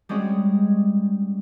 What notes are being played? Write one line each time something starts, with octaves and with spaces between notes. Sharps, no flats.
G3 G#3 C4 C#4 F#4 G#4